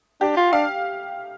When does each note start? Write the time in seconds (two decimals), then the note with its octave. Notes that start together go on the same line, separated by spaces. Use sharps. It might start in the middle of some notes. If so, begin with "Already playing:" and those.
0.21 D4 G4
0.37 F4
0.53 D4 F5